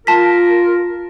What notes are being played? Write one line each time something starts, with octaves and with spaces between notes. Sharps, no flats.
F4 A#4 A5 B6